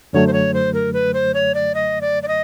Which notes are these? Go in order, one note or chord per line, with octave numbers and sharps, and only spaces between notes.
F#2 D3 F#3 A3 C#5
C5
C#5
C5
A#4
B4
C5
C#5
D5
D#5
D5
D5
D#5